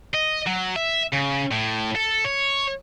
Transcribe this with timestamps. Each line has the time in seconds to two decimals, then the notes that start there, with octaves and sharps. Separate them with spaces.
0.14 D#5
0.47 F#3
0.76 E5
1.13 C#3
1.51 A2
1.95 A4
2.25 C#5